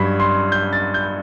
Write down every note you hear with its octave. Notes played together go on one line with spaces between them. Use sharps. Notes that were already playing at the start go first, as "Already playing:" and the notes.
Already playing: G2 F#3 B5
C6
G6
A6
G6